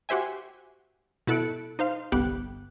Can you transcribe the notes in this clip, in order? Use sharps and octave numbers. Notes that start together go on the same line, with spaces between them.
F#4 G4 C5 E5 G#5
B2 E4 A4 F#6 C#7 D7
D#4 C5 F5
G1 C2 B3 G4 F#6